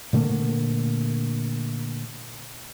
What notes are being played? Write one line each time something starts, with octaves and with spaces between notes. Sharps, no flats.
A#2 D3 A3 A#3